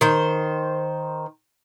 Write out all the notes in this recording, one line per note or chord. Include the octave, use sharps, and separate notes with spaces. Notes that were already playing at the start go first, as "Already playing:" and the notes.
D#3 C5